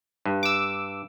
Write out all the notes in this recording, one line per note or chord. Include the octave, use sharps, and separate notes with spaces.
G2
D6 E6